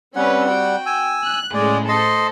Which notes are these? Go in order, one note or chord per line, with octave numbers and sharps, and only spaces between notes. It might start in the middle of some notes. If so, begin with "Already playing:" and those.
G3 C4 C#4 B4 F#5
F#4 G5
G#5 E6
F#6
A2 C#3 G#3 D5
A4 C5 D#5 C6